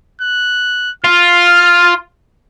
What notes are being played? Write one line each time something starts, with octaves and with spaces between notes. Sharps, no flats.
F#6
F4 F6